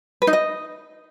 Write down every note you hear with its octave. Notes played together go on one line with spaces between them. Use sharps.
B4
D#4
D#5